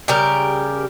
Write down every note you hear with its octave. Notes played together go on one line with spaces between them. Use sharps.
C#3 G3 G4 A#4